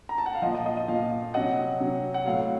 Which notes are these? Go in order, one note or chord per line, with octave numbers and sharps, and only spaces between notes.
A#5
A5
F#5
F5
A#2 F3 D#5
D#5
D#5
D#5
A#2 F3 F5
C3 F#3 D#5 F#5
C3 F#3
F#5
A2 F#3 F5